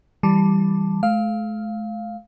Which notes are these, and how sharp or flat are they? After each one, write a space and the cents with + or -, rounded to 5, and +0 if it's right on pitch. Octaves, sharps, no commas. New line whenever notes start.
E3 +0 G3 +0 A5 +5
A3 -45 F5 +0